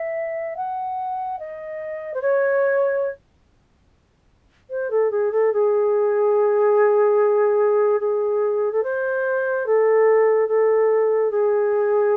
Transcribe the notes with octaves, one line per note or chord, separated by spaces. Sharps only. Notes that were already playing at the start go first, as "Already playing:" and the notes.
Already playing: E5
F#5
D#5
C5
C#5
C5
A4
G#4
A4
G#4
G#4
A4
C5
A4
A4
G#4